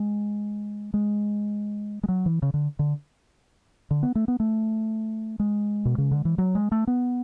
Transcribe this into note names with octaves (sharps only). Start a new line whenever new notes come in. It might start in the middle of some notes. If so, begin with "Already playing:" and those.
Already playing: G#3
G#3
G#3
F#3
E3
C#3
D3
D3
D3
B3
A3
B3
A3
G#3
B2
C#3
D3
E3
F#3
G#3
A3
B3